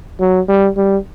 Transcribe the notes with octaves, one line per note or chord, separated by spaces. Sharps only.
F#3
G3
G3